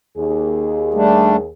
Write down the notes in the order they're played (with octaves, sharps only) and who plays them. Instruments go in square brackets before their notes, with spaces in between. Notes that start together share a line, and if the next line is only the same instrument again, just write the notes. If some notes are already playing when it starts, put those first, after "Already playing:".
[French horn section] D#2 G#4
[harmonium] G3 A3 D4